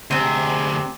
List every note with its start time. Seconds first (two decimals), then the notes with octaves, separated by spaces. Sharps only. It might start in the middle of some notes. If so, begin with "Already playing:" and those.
0.11 D2 C3 C4 G#4